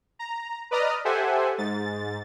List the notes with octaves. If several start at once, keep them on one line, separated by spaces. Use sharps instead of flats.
A#5
B4 D5 D#5 A#5 D#6 F6
G4 A4 C5 E5 F#5 G#5
G#2 A6